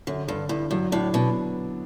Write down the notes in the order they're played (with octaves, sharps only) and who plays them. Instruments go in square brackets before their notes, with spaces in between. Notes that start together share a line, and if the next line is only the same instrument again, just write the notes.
[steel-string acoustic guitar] F#2 [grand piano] D3
[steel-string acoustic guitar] G2 [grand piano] D3
[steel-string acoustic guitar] G2 [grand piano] E4
[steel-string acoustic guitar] G2 [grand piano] F#3
[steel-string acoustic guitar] A2 [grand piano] D4
[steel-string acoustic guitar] B2 [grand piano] B3